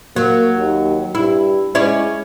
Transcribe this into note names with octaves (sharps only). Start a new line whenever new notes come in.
F#3 A#3
D#2
G2 E4
G#3 C#4 E4 D5